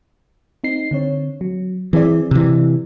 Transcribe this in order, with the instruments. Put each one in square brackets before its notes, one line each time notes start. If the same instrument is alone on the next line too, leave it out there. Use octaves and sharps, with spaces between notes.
[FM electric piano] C4 D#4 C7
D3 C4 C#5
F#3
[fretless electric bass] E3 [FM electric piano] C4 G#4 D5
[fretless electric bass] C3 E3